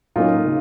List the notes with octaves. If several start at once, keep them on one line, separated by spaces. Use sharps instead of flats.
A2 F#3 A#3 C#4 D#4 F4
C#3